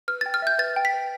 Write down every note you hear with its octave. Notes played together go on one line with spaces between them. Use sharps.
B4 F6
G5 A6
F6
E5 G6
B4 A6
G5
B6
B4